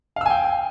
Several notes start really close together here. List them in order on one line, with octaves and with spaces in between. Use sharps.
F5 E6 G#5 G5